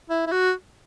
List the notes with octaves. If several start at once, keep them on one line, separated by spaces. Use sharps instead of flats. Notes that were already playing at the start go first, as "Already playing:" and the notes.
E4
E4
F#4